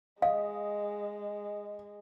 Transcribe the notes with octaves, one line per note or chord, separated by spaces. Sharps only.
G#3 D#5 F5